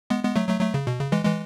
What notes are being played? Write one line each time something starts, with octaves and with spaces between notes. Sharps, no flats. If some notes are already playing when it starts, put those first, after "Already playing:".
G#3 B3
G#3 B3
F#3 A3
F#3 A3
F#3 A3
C#3
B2
C#3
E3 G#3
E3 G#3